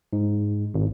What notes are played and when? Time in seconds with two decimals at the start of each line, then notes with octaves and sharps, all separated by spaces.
0.13 G#2
0.74 G#1